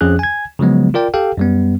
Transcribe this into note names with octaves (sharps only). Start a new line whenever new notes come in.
F2 F3 C#4 G#4 F#6
G#5 G#6
C#3 F3 F#3 G#3 B3
F4 A#4 D5 G5
G4 A4 F5 G5
F#2 G3 B3